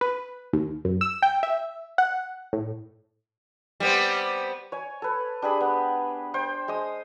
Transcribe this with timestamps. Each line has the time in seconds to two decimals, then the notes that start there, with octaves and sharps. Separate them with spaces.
0.01 B4
0.53 D#2
0.85 F#2
1.01 E6
1.22 G5
1.43 E5
1.98 F#5
2.53 A2
3.80 G3 B3 C4
4.72 C#5 G#5
5.02 A4 B4
5.42 D4 G4 G#4 B5
5.61 B3
6.34 C5 G5
6.68 G#3 D#6